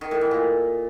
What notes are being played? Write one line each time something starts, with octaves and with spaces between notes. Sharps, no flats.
D#3
A2
E3
A#2